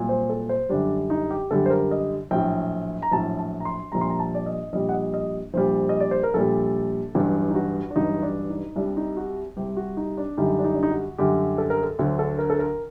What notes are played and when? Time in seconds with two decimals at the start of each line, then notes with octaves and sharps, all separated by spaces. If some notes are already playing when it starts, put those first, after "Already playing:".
Already playing: C2 A#2 F#3
0.09 C5
0.30 A4
0.49 C5
0.69 F#2 D3 G3 D4
1.10 D#4
1.31 G4
1.50 F#2 D3 G3 A4
1.66 C5
1.70 A#4
1.91 D#5
2.31 A#1 A2 F#3 G5
3.02 A#5
3.12 A#1 A2 F#3 A5
3.38 A5
3.60 A#5
3.65 C6
3.92 A#1 A#2 G3 A#5
4.01 C6
4.10 A#5
4.19 A5
4.35 D5
4.46 D#5
4.73 A#1 A#2 G3 D#5
4.89 F#5
4.93 D#5
5.14 D#5
5.54 A#1 A#2 G3 C5
5.89 D#5
6.00 D5
6.11 C5
6.23 A#4
6.34 A#1 A#2 G3 A4
7.15 A1 G2 F#3 G4
7.50 D#4
7.55 F#4
7.90 D4
7.96 A1 G2 F#3 D#4
8.22 D4
8.50 D#4
8.76 C2 C3 G3 D4
8.97 D#4
9.17 F#4
9.56 C2 C3 G3 G4
9.77 F#4
9.97 D#4
10.17 D4
10.37 F#2 D3 G3 D#4
10.59 D4
10.64 D#4
10.74 D4
10.83 D#4
10.91 F#4
11.18 F#2 D3 G3 G4
11.58 A4
11.70 A#4
11.83 A4
11.99 D2 D3 F#3
12.19 A4
12.39 A#4
12.50 A4
12.59 A#4